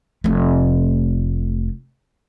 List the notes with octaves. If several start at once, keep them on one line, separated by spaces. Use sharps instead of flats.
F1 A3